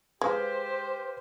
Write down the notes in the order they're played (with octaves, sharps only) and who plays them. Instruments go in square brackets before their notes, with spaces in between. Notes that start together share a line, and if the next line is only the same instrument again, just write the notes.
[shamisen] G#3 [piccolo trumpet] G4 [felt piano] B4 F5 [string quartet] C5